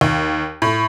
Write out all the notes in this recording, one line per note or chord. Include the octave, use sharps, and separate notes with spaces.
D#2
A2